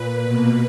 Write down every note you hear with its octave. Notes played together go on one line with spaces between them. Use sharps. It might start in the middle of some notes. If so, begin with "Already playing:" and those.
Already playing: A#2 B4
B2 A#3